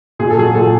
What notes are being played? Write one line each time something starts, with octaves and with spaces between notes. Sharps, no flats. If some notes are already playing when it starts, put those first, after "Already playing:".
A#2 G#4
A4
F#3 G#4
A#2 A4